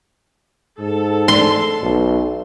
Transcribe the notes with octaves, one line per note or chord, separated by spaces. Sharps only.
G#2 A4
C6
B1